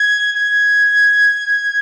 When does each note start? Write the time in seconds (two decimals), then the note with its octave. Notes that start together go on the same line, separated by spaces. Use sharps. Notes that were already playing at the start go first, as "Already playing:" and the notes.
Already playing: G#6
0.34 G#6